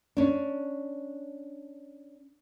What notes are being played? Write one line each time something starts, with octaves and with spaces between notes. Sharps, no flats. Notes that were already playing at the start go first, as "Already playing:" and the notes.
C#4 D4